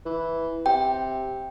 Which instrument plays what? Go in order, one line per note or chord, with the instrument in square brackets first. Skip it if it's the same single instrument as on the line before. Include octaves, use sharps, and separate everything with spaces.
[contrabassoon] E3
[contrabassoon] C3 [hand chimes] G5